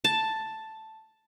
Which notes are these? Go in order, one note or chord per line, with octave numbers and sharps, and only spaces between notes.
A5